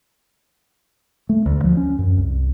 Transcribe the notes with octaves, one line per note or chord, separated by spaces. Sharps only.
A3
D2
F3
C#4
F#2
C2